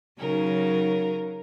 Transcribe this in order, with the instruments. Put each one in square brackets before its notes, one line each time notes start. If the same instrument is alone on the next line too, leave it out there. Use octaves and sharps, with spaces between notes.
[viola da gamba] C#3 F#3 D#4 [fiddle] A#4